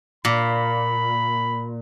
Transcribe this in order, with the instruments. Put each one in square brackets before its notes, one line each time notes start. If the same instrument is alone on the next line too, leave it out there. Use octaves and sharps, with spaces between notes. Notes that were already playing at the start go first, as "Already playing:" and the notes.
[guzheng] A#2 [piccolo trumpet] B5